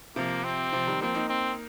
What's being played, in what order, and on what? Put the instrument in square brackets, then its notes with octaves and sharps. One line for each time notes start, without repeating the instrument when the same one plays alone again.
[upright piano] C3 F3 [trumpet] A#3
[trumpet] C4
[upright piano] C3 F3
D#3 G3
[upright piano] F3 A#3 [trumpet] C4
[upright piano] A#3 D#4
[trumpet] C4